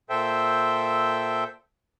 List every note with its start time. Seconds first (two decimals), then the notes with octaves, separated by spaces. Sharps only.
0.10 A#2 A4 C5 E5 G5